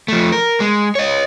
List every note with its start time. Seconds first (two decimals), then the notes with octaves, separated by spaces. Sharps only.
0.08 F3 A3
0.32 A#4
0.60 G#3
0.95 C#5 D#5